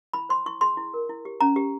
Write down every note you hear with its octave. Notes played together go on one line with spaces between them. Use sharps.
E4 B5
C5 C6
E4 C#6
G#4 C6
E4
A#4
E4
G4
C#4 A#5
G4